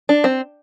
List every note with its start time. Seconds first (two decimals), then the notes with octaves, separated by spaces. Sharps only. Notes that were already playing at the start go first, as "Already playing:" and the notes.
0.09 D4
0.24 C4